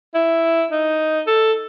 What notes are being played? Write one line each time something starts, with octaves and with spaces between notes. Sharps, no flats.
E4
D#4
A4